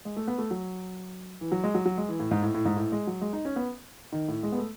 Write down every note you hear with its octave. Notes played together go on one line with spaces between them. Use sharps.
G#3
A3
B3
A3
F#3
E3
F#3
G#3
F#3
F#3
G#3
E3
A2
G#2
A2
A2
G#2
A2
G#3
F#3
G#3
D#4
C#4
B3
D#3
A2
G#3
B3
A3